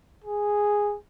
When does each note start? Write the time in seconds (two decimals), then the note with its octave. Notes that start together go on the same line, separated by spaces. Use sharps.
0.24 G#4